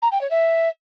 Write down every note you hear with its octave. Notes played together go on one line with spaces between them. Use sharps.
A#5
G5
C#5
E5